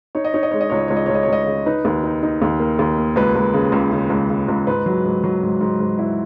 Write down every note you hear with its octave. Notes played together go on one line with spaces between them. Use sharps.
D#4 C#5
D#5
D#4 C#5
D#5
G#3 C#5
D#5
C#2 C#5
D#5
C#2 C#5
D#5
C#2 C#5
D#5
C#5
C#2 D#5
C#3 C#5
D#4 B4
D#2
D#4
D#4
D#2
A#3
D#2
A#3
C#2 B4
C#2
C#3
C#2
C#3
C#2
C#3
C#2
G#2 B4
F#3
G#2
F#3
G#2
G#2
G#2
E4